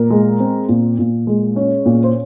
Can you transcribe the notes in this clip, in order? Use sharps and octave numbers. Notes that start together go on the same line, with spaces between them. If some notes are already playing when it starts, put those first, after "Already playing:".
Already playing: A#2 A#4
G#3
C4
A#2
A#2
G#3
C#4
A#2
C5